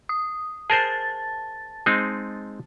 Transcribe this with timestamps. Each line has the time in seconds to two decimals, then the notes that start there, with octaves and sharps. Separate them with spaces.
0.09 D#6
0.70 G#4 A#4 C5 A5 A6
1.86 G#3 C4 D#4